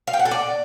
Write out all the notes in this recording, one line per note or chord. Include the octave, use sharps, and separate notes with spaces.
F5
G5
F#5
A4
D5